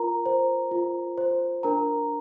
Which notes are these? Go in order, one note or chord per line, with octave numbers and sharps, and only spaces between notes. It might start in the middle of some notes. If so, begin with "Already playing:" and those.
Already playing: F4 A#4 A#5
C5
F4
C5
D4 A#4 A#5